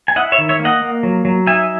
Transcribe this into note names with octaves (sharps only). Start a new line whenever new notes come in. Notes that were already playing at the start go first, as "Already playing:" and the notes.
G#5
E4 D#5 F#5
C#5 E5
D#3
C#5 E5
A#3
D#5 F#5
A#3
F#3
F#3
D#4 E5 G#5